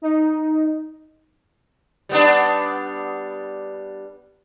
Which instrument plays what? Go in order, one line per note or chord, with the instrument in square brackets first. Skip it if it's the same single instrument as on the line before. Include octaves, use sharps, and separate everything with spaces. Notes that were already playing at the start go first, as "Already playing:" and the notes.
[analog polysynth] D#4
[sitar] G3 B3 D4